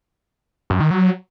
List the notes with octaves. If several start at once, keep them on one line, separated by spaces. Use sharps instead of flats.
F#2
D#3
F#3